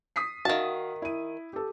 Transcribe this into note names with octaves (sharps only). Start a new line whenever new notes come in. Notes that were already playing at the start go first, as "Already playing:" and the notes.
D#6 B6 C7
D#3 F#4 E5 F5 A5
E4 D#7
G4 A4